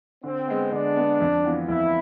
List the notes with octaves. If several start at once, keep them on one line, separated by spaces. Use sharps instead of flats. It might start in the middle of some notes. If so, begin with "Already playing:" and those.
D3 C4
G#3 B3
D3 D4
G#3 B3
F2
E3 B3 F4
F2 E4